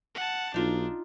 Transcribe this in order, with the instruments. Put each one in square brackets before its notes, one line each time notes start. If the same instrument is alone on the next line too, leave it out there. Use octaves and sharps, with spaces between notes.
[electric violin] F#5 A5
[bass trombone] B1 [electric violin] D4 [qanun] D#4 F4 D#5